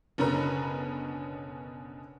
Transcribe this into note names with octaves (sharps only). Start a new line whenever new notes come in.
F#1 B2 D3 C#4 B4 A#5